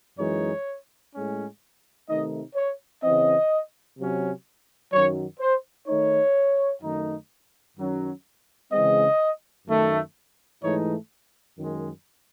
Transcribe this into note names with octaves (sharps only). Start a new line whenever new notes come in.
F#2 E3 G#3 D#4 C#5
A2 G#3 C#4
C3 D#3 A3 D#4 D#5
C#5
C#3 E3 C4 D#5
C3 F#3 C#4
F#2 D#3 F#3 C#5
C5
D#3 A3 D#4 C#5
F#2 D#3 A3 D#4
F#2 D#3 F#3 C#4
C#3 E3 G#3 C4 D#5
F#2 D#3 A3
G#2 E3 A3 D#4 C#5
F#2 D#3 G#3